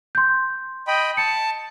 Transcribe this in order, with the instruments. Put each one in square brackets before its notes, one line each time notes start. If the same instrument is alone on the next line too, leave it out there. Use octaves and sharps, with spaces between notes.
[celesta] C6 G6
[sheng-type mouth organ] D#5 G5 B5
[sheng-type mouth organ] A5 [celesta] C#7